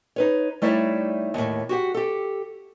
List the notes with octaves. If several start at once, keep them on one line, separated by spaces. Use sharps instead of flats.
D#4 B4 C#5
G3 A3 D#4 E4 C#5 D5
D#2 A2
F#4 G4 F#5
G4 A4